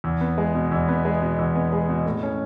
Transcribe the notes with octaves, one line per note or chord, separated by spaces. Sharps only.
E2
B3
G#3
B2
E2
B3
G#3
B2
E2
B3
G#3
B2
A2
C#4